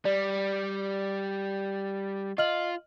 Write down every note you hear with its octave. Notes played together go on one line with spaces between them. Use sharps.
G3 D5
F4 D#5 F6 F#7